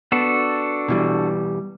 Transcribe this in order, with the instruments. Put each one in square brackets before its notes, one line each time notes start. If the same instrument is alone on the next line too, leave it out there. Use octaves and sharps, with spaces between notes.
[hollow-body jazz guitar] B3 [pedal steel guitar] D4 F#4 A4
[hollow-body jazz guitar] B2 E3 G3